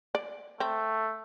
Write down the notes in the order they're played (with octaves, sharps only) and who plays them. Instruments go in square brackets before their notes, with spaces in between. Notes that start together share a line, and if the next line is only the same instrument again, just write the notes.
[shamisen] D5
[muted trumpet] A3 [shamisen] C4